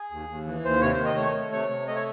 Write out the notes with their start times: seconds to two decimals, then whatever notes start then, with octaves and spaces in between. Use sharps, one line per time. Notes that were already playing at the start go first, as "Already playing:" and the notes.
Already playing: G#4
0.11 D#2
0.29 D#2
0.47 E3
0.65 D#2 C5
0.81 C3 C#5
0.94 C5
0.99 D#3
1.06 D#5
1.17 A3 C#5
1.35 A3
1.52 C3 C#5
1.70 C3
1.88 A3 D#5
1.96 C#5